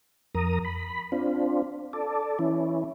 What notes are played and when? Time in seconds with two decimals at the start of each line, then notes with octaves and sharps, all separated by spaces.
0.35 F2 A#4 A#5 D#6
0.65 B5
1.12 C4 D4 F4
1.93 A4 D5
2.39 E3 C#4 E4